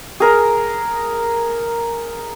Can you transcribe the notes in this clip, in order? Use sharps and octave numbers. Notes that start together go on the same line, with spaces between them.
G#4 A#4 A#5